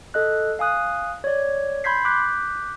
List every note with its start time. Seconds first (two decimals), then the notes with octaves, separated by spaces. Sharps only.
0.14 A4 D#5 F#6
0.59 F5 G#5 D#6 F#6
1.24 C#5 D5
1.84 B5 C6 G6 G#6 B6 C7
2.05 D6 F#6 G6 B6